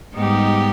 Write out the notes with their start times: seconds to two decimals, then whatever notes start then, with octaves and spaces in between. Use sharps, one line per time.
0.14 G#2 G3 B3 D#4 G4